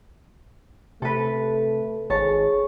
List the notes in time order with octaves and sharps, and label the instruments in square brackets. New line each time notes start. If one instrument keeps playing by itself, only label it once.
[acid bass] C3 [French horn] A3 [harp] A4 B4
[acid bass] G#1 [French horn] G#4 [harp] C#5 A5